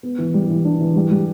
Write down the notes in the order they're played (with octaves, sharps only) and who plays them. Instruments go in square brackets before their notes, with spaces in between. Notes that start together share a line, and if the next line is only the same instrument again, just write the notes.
[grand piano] B3
E3
G3
E3
D4
E3
G3
G3